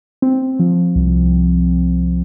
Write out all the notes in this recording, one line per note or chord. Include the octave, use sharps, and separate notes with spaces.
C4
F3
C2